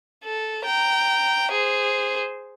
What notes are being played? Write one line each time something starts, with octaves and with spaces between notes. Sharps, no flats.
A4
G5 A#5
G#4 C5